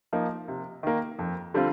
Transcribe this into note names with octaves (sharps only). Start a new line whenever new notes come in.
F3 A#3 D#4
C3
D#3 A#3
F2
D3 G3 C4 F4